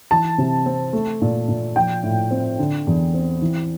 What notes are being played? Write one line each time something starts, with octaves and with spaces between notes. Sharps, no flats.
E3 A5
C3
C4
A3
A#2
A#2
F3 G5
A2
C4
D3
E2
C4
E3